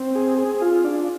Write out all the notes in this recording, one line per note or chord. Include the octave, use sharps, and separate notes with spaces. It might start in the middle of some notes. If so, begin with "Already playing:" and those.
Already playing: C4
G#4
G#4
F4
D4